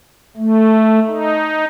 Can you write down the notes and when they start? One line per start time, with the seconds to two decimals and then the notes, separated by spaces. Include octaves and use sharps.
0.37 A3
1.08 D#4